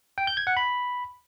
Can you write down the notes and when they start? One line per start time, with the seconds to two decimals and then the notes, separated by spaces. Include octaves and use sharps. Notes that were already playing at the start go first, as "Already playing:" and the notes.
0.18 G5
0.27 G6
0.37 G#6
0.47 F#5
0.57 B5